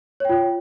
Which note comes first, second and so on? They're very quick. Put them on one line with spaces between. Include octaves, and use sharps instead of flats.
C#5 G5 F4